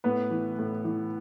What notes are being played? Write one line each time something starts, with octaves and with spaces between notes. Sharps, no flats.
A2 B3 B4
E3
A2
E3